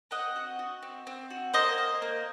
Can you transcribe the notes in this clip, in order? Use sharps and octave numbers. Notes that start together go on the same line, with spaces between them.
C4 D#5 F#5
F#4
F#4
C4
C4
F#4
A#3 C5 D#5
A#3
A#3